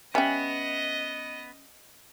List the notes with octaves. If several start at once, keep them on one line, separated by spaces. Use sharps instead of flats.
G3 B3 C#4 D#5 E5 G5 G#5